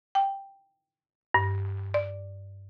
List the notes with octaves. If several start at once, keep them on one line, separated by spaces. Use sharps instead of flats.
G5
G2
D5